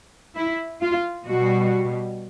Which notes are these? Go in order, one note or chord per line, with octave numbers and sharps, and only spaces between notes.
E4
F4
B2 G3 F#4